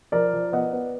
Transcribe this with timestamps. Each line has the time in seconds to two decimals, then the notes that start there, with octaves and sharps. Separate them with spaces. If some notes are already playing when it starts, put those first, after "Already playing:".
0.12 F3 A#4 D5
0.33 F3
0.52 B3 D#5 F#5
0.73 B3